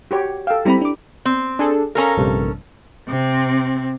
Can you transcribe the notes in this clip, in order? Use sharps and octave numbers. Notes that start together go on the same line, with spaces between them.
F#4 G4 C#5
A4 F5 G5 E6
G3 C4 E4 G4 A#5 B5
D4 D6
C4
D4 G#4 A4
C#4 A4 A#4 F5 G#5 A#5
A#1 G2 C3
C3 C4